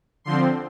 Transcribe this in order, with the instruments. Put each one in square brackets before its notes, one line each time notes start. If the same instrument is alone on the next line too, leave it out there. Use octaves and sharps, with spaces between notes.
[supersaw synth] D3 F3 C4 C6